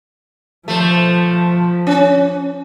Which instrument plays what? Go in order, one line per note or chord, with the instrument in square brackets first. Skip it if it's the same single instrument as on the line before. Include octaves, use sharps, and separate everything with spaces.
[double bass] F3 [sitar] A3 C5
[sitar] C#4